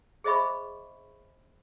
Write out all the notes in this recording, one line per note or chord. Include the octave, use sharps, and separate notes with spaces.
G#4 C5 D#5 E5 B5 C#6